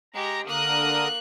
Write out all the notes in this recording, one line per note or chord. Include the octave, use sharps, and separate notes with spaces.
G#3 G4 A#5
D3 A#3 A#4 D#6 F#6